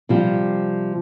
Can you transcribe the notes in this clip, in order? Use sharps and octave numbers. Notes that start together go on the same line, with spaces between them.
C3 F3 G3